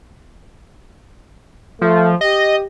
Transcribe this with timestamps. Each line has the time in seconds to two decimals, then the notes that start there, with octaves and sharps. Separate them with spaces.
1.81 F3 A3
2.21 G4 D#5